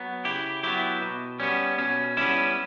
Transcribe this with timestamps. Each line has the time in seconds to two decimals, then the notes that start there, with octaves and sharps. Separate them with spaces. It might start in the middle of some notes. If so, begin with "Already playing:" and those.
Already playing: F#3 B3
0.25 C#3 E4 G4
0.63 F#3 B3 E4 G4
1.02 B2
1.40 G3 B3 C#4
1.78 B2 C#4
2.17 G3 B3 C#4 E4